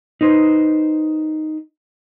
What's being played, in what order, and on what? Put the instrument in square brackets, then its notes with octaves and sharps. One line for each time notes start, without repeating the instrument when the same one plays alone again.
[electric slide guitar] D#4 B4 C5